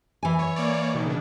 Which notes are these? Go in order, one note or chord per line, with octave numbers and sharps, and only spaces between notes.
E3 G#5
C#5
A#3 C#5 D5
B2 D#3
C#3 D4